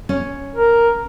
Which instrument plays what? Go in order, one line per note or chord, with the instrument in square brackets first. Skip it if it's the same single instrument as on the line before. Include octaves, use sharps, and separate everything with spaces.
[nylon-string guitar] C#4
[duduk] A#4